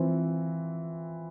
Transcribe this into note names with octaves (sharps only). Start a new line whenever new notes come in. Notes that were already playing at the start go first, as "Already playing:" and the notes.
Already playing: E3 F3 C4